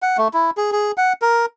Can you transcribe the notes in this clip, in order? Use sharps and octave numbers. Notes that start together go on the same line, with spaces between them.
F#5
A3
E4
G#4
G#4
F#5
A#4